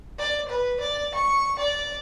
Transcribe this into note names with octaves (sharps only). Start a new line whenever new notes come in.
D5
B4
D5
C#6
D5